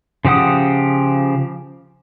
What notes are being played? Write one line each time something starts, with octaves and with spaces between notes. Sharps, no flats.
C#3 F3 G4 F#5 D#6